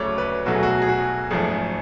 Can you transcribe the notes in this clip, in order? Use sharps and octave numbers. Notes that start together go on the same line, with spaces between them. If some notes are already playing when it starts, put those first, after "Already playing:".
Already playing: D2 C#3 F#3 A3 C#5 D5
B4
B1 B2 F#3 A3 F#4
G#4
F#4
G#4
F#4
G#1 F#2 F3 A3 G#4